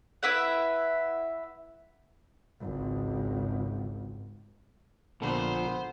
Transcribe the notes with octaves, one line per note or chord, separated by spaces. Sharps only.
E4 B4 E5 F#5
G#1 C#2
A#1 A#2 D3 B3 A4 C5